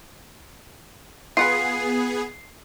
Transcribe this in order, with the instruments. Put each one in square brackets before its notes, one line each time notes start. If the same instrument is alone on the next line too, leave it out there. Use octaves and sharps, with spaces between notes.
[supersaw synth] B3 G#4 [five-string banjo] F4 F#5 B5 [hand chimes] C7